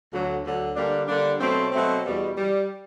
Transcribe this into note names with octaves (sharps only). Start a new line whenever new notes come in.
D2 D3 F#3
D2 D3 F#3
D3 G3 A#3 D4
D3 G3 A#3 D4
B2 F#3 A3 C4
B2 F#3 A3 C4
E2 B2 G3
G3